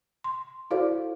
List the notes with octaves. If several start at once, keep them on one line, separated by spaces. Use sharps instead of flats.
C6
E4 F#4 A4 C5 D5 F5